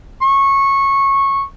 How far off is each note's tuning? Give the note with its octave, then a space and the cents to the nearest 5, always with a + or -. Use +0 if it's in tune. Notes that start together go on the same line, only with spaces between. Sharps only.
C#6 -15